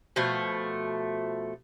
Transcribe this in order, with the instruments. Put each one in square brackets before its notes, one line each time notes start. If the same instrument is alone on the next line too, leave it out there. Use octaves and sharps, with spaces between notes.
[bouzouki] B2 F3 A3